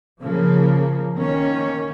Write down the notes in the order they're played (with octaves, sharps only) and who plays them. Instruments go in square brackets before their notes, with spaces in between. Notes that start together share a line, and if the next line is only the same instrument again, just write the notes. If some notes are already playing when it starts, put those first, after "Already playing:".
[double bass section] C#3 F3 A#3
D#3 A#3 C#4